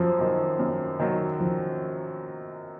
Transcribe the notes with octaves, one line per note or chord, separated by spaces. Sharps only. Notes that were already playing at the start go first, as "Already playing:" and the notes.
Already playing: F#2 F3
D#3 F#3
F#2
D#3 F#3
F3